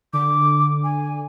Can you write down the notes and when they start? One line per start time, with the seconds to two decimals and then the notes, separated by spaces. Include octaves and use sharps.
0.13 D3 D6
0.84 G#5